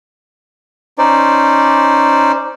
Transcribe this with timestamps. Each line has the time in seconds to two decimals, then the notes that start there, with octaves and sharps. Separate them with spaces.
0.98 C#4 D#4 C5 D5